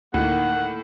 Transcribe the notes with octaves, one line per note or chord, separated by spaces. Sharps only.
D2 A2 D#3 A#3 F#5